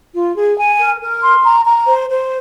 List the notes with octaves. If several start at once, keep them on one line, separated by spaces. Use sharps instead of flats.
F4
G#4
G#5
A#4
A#4
C6
A#5
A#5
C5
C5